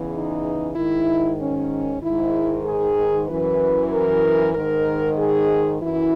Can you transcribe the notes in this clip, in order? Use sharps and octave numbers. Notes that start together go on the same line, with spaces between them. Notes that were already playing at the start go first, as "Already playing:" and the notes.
Already playing: E2 C#3 E3
D#4
G#2 D#3 E4
C#4
G#2 D#3 E4
G#4
F#2 E3 B4
A#4
G#2 D#3 A#4
G#4
F#2 E3 E4